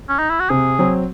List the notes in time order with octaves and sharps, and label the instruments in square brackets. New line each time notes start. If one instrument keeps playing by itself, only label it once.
[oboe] C#4
D#4
E4
F#4
[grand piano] C3 [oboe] G#4
[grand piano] F#3 C4